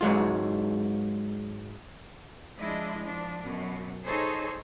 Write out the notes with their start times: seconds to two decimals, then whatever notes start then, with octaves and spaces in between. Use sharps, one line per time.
0.01 G#2 F#3 G#3 F4
2.58 F3 G#3 D4 E4 D#5
3.01 F3 D4
3.43 F#2 B2
4.04 D#4 G#4 A4 C5 C#5